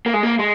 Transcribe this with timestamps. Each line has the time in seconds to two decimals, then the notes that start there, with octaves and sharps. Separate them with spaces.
0.06 A#3
0.14 G#3
0.23 A#3
0.39 G#3